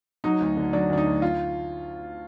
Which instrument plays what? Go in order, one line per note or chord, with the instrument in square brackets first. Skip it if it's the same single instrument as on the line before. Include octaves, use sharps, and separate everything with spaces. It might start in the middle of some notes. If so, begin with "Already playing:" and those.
[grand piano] F#3 D#4
D2
D3
F#3 D4
D2 D4
D#4
D2
F4